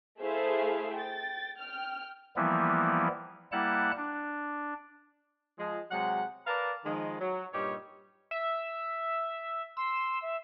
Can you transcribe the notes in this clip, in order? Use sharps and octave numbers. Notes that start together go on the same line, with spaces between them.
A3 E4 G#4 C5 E5 F5
G5 A6
G5 F6
E3 F3 G3 A#3 B3 E4
G3 A#3 E4 F#5 A5 F#6
D4
F3 G#3
C3 F#3 G#3 F#5
A#4 B4 D5 F5 A5 A#5
D#3 F3 G#3
F#3
G2 A#2 G3 D#4 G4 C#5
E5
C6 E6
E5